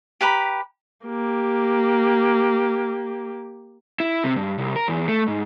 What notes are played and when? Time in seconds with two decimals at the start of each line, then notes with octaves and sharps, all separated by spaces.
0.21 G4 B4 A#5 B5
1.05 A#3 G4
4.00 E4
4.24 C3
4.36 G2
4.58 C2
4.76 A#4
4.88 E2
5.08 A3
5.28 G#2